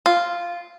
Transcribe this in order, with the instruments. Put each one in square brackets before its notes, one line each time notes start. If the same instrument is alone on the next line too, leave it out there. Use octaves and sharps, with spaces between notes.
[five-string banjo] F4